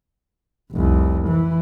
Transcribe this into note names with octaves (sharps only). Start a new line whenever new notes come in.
F1 C2
E3